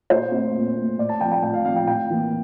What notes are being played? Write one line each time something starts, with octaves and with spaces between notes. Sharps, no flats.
A#2 C5
A3 C4
A#2
A3 C4
A2 D5
A5
F3 A3 C4 G5
G5
A2 G5
F5
F3 A3 C4 F5
G5
A2 G5
E3 A#3